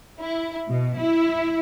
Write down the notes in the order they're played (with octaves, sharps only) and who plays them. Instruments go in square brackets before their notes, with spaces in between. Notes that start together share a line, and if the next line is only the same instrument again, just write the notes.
[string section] E4
B2
E4